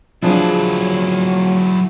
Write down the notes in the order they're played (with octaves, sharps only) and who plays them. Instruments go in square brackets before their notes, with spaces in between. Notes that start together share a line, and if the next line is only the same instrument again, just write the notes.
[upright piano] F3 D4 G#4 [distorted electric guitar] F#3 E4